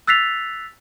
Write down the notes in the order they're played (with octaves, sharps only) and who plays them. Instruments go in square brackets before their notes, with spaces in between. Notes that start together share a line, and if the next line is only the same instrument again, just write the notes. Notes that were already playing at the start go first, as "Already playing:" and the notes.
[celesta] E6 F#6 A6 B6 C7 F7